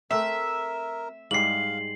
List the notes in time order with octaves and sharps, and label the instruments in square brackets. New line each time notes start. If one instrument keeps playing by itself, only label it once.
[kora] A3 C4 [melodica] A#4 [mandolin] E5
[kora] G#2 G3 G#3 [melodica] F5 [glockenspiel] C7 F#7